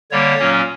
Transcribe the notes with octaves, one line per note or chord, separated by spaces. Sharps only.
D3 G3 A#3 C#5
A#2 F#3 A#3 C#4